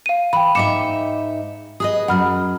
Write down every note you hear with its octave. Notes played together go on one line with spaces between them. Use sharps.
F5 D#7
E3 G5 B5
G#2 D#4 E5 D6 C#7 E7
G#4 B4 D#5 D#6
F#2 F#3 F#5 B5 F6